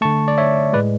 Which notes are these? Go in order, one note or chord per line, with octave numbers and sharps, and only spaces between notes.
D3 A3 A5 C#6
D5
C#5 E5
A2 G#3 B4 D5